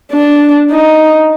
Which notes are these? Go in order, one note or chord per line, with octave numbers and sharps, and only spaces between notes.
D4
D#4